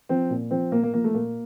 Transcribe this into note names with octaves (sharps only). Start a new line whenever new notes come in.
F3 C4
A#2
F3 C4
A#2 A#3
A#3
F3 A#3
A3
A#2 A#3